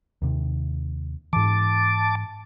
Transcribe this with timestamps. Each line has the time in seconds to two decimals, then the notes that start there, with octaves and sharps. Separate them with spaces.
0.22 D#2 C3
1.33 G#2 E3 A5 D6